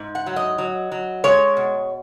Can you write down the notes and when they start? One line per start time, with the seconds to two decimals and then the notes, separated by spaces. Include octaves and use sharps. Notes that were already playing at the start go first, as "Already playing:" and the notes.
Already playing: G#2
0.15 F#5
0.26 F#3
0.36 D#5
0.58 F#3
0.92 F#3
1.24 G#3 C#5
1.57 B2